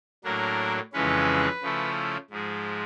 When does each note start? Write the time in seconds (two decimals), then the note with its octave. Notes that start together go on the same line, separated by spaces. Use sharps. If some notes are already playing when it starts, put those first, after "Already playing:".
0.24 A2 F#3 A#3 D4 A#4
0.93 F2 C#3 E3 G#3 C#4 B4
1.62 C#3 F3 A3 C#4 E4
2.30 G#2 F3 G#3